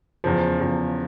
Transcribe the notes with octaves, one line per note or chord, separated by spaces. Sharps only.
E2 C#3 F3
E2 C#3 F3